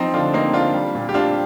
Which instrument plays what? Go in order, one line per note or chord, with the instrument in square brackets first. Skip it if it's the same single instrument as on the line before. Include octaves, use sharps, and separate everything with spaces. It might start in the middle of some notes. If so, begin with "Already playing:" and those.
Already playing: [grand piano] F3 [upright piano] C4 D#4
[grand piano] D3 [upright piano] D4 F4
[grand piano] A#3 [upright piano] C4 D#4
[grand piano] D3 [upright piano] D4 F4
[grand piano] G3
A#2
[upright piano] G4
[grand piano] C4 [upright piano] D4 F4